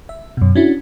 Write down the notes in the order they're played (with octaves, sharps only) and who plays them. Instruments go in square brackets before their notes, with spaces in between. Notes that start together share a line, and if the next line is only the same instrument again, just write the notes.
[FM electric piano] E5
F#2 B2
C#4 D4 E4 F#4